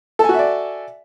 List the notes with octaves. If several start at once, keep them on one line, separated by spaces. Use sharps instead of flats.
F#4 A4 D5 E5 G#5